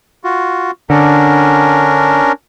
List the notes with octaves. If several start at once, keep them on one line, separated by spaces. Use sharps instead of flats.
F4 F#4
D3 C#4 D4 A#4